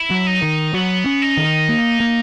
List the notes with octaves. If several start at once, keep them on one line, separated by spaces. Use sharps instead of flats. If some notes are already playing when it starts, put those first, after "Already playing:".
Already playing: E4
F#3
D#4
D#3
F#3 B3
C#4
D#4
D#3
A#3
A#3